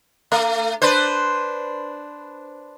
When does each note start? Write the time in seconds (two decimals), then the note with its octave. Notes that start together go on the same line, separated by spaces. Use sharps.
0.32 A3
0.82 D4 B4 C5